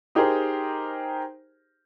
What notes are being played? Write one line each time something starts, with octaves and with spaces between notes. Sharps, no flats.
D#4 G4 G#4 A#4 C5